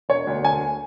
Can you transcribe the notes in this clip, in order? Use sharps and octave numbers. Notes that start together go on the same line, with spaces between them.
E1 C#5
D2
E1 G#5